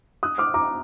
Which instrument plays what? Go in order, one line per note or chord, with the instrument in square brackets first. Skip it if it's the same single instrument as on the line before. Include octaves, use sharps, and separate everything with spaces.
[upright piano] D#6 F#6
D6 F6
A#5 D6